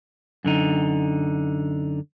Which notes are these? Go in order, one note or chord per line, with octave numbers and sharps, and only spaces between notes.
F#2 D3 D#4